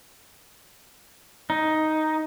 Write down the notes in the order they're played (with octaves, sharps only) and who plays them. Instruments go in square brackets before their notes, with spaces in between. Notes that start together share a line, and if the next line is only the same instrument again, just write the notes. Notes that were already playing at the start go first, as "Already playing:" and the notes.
[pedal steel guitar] D#4